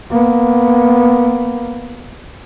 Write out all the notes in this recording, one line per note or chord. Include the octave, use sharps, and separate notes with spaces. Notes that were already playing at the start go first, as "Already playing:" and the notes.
A#3 B3